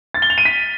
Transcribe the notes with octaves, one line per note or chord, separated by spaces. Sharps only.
A6
G7
F7
D#7
B6